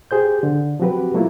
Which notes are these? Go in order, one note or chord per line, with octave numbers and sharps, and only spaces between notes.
G4 G#4 C5 G6
D3
F3 F#3 C4 F#4 G4 B4
F#3 A3 A#3 E4 F4